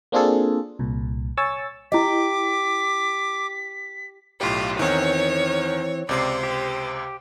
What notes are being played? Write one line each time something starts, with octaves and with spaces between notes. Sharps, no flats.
A#3 C4 D4 F4 G#4 A4
C2 A#2
C#5 G#5 C#6 E6 A6
E4 G4 D#5 D6 B6
B1 A2 F4 G4
E2 D#3 E3 C4 C#5
C#2 C3 C5 D5 C7
G4